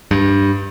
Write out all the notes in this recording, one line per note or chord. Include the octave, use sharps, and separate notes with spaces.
G2